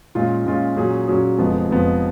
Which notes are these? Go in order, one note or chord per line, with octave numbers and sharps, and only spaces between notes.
A#2 G#3 C#4 F4
A#2 G#3 C#4 F4
A#2 F#3 C#4 G#4
A#2 F#3 C#4 G#4
F1 F2 F3 G#3 B3
F1 F2 F3 G#3 B3